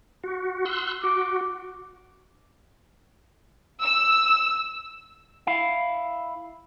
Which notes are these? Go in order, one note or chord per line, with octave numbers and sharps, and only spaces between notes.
F#4
C6 E6 F#6
F#4 D6
E6
E4 F5